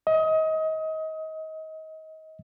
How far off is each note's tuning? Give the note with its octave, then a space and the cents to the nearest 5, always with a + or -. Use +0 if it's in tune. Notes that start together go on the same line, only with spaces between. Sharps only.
D#5 +25